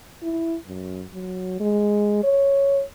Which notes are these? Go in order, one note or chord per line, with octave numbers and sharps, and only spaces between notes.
E4
F#2
F#3
G#3
C#5